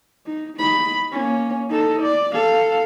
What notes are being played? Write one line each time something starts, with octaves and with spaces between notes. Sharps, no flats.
D#4
D#4 B5
A#3 C#4
D#4 A4
D5
A4 F5